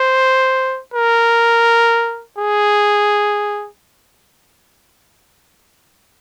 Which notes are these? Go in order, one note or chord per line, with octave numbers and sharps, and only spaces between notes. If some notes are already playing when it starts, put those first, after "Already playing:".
Already playing: C5
A#4
G#4